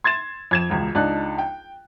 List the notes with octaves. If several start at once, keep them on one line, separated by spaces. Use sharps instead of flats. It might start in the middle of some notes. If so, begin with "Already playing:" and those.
C6 G#6 A6 E7
F2 G#6 E7
E1 C#2
C#2 D4 D#4 A5 F#6
G5